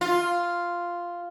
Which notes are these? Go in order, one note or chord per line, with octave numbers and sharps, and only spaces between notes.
F4